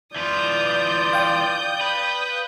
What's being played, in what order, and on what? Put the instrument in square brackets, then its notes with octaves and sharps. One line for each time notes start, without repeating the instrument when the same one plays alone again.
[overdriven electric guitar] E3 F4 [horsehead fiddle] D5 [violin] D#6 G6
[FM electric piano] F5 G5
[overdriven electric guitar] B4